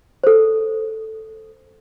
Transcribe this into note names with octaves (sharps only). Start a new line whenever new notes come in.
A4 C5